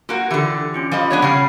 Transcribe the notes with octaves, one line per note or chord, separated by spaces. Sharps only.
A#3 F4 F#4 A#4 F#5
D3 E3 G4 C#7
C#4 F4 G4
F3 F4 D#5 G#5 B5
B3 D4 C#5
C#3 G3 C#4 F#5 B5 C7